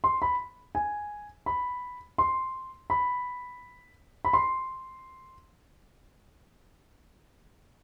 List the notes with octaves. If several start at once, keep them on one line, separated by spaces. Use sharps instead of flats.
C6
B5
G#5
B5
C6
B5
B5
C6